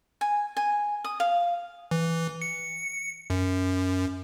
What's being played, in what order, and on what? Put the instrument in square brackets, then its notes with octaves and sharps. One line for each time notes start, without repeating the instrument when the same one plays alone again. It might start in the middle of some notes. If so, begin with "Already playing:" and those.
[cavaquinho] G#5
G#5
D#6
F5
[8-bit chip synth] E3
C#7
F#2